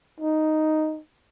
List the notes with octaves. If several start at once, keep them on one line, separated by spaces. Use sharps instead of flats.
D#4